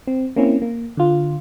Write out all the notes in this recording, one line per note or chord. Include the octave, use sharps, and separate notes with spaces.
C4
A#3 C4 C#4 E4
A#3
D3 F4